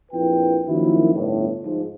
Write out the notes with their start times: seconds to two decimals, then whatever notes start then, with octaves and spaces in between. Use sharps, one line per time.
0.12 A#1 F2 E4 F4 B4 G5
0.67 F#2 D#3 F3 F#3 A#3 E4
1.14 G1 A2
1.64 G#2 F3